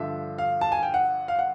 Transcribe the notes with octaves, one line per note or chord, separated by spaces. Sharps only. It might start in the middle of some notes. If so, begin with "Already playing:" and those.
Already playing: G2 D3 F3 E5
F5
A5
G#5
G5
F#5
F5
F#5